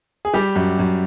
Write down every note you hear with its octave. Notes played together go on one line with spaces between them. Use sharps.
G#4
G3 G4
F#2
F#2